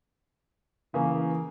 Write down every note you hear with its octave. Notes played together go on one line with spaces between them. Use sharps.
C#3 E3 A#3